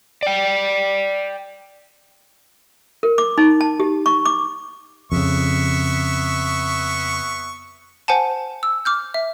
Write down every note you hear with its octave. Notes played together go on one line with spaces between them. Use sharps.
D5 G5
A#4
D6
D#4
A5
G4
C#6
D6
F2 C#3 B3 E5 C#6
C5 F#5 G#5 A5
E6
D6 F6 G6
E5